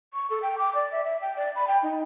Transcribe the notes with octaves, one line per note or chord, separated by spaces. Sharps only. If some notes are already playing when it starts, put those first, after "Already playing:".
C#6
A4
G5
D6
D5
E5
E5
G5
D5
B5
G5
D#4